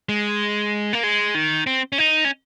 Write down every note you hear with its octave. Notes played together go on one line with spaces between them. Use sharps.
G#3
A#3
G#3
D#3
C4
C#4
D#4
C#4